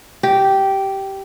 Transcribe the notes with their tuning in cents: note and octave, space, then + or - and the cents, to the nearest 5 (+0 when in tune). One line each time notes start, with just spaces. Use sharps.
G4 -10